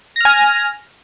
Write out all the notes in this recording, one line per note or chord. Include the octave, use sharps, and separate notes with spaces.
G#5 F6 A#6